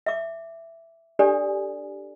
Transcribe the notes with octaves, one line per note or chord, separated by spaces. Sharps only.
E5 D6
D4 G4 A4 D5 G#5